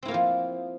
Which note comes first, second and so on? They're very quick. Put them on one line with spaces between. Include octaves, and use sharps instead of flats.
C4 E4 A#3 F4 F3